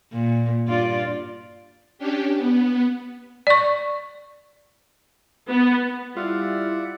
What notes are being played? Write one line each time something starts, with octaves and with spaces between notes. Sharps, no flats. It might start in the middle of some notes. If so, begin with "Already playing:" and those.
A#2
G2 F4 D5
C#4 D4 G4
B3
D5 C#6
B3
G3 E4 F4 D5 E5 F#5